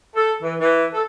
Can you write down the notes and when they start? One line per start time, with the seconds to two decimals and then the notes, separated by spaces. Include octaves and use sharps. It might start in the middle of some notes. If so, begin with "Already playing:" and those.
0.16 A4
0.42 E3
0.59 E3
0.94 A4